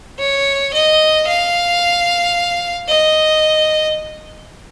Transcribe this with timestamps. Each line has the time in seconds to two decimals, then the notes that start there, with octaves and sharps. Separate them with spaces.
0.19 C#5
0.74 D#5
1.28 F5
2.89 D#5